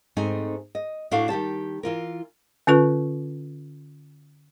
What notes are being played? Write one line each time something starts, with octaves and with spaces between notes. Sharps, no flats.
G#2 A3 C4 D#4 G#5
D#5
A2 D4 E4 F#4 A4 F5
D#3 G3 G4 A5
E3 F4 A#4
D3 C#4 F4 B4 C#6